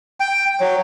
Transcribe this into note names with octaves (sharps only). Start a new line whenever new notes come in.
G5
F#3